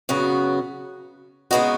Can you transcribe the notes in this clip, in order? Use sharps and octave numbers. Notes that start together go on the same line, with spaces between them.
F#2 C#3 B3 F#4
C#3 G#3 B3 D#4 F#4